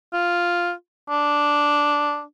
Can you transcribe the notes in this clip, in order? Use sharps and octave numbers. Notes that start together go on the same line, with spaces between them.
F4
D4